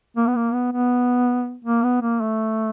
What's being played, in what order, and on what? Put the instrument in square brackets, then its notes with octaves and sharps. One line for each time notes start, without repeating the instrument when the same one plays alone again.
[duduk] A#3
B3
A#3
B3
B3
A#3
B3
A#3
A3